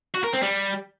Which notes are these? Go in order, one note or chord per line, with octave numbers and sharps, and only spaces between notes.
F#4
A#4
C4
G3